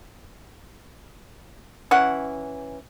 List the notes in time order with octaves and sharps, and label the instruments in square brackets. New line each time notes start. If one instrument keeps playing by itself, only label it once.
[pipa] E3 C#4 F#5